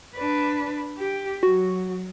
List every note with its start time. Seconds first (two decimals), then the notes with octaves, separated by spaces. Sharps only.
0.15 D4 B4
0.98 G4
1.43 F#3 F#4